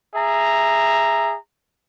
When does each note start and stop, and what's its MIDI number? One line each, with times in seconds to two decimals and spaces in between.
0.15 1.36 68
0.15 1.36 76
0.15 1.36 82